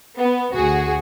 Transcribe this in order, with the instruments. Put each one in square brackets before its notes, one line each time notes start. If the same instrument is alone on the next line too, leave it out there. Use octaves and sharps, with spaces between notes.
[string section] B3
D2 F#4 G#4